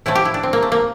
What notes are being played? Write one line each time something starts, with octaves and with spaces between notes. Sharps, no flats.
A2 F3 A3 E4
G4
E4
D4
C4
A#3
A3
A#3